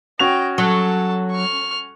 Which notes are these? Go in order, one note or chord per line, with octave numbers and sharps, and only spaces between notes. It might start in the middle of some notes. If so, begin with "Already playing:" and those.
C#4 F#4 D#5 G5 F7
F#3 A4 A5
C#6 F6